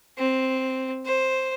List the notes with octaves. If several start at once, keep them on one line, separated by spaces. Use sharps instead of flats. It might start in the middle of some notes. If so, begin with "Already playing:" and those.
C4
C5